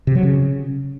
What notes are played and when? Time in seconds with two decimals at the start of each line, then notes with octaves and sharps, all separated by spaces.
0.07 C3
0.15 F#3
0.23 C#3